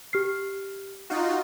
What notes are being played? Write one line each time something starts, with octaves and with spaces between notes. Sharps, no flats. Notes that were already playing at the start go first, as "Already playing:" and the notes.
G4 F6 C7
D#4 F4 F#4